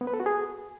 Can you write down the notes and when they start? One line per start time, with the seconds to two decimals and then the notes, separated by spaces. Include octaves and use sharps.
0.01 B3
0.07 B4
0.14 A4
0.20 F#4
0.26 G#4